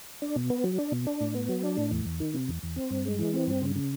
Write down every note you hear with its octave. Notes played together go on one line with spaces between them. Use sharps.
D4
B2
B3
F#3
D4
B2
D4
A2
B3
F#3
D4
A2
E2
E2
D#3
C3
E2
E2
C4
G2
G#3
E3
C4
G2
C#3
C#3